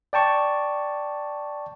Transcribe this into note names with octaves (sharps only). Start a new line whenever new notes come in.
D5 G5 A5 C#6